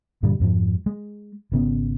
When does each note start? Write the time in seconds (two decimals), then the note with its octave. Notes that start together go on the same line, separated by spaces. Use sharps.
0.23 G2 A#2 D3 G3
0.40 F2 G#2 F3
0.86 G#3
1.52 G#1 C#3 B3